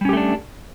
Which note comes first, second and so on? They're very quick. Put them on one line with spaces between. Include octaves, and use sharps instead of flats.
G3 C#4 G4 A3 D4